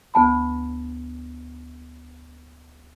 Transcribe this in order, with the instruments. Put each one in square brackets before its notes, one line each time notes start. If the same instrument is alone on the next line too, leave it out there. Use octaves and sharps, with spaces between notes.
[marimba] D2 B3 A5 B5